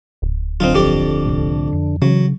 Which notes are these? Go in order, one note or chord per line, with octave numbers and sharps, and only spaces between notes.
D1
G1 D3 F#3 C4 D#4 F4
F2 G4 D5
C2 A2
F2
C#3 E3 F#3